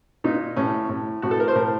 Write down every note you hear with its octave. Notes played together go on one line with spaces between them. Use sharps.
A#2 D#4
A2 C#4
A2
A2 F#4
A4
A#4
C5
A2 A#4